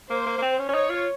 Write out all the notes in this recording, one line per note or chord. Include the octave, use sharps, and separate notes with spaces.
A#3 C5
A#3
A#3
C4
C#4
C#4
D#4 C#5
F4